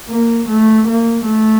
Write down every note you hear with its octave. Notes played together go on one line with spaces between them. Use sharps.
A#3
A3
A#3
A3